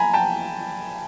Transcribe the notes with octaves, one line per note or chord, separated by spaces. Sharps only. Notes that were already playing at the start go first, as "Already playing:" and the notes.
Already playing: G#5 A#5 B5
G5 A5